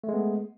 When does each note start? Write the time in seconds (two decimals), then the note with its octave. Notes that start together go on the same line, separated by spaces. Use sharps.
0.04 A3
0.09 G#3
0.14 B3